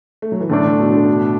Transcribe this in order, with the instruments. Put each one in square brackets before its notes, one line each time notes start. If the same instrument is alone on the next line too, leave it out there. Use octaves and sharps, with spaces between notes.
[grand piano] A3
F#3
E3
[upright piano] A2 A3 D4 [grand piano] D3
[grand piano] B2
D3
B2